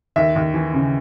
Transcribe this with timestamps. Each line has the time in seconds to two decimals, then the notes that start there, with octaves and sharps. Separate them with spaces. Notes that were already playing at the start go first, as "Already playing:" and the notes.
0.16 D#2 E5
0.36 D#2
0.54 E3
0.74 C#3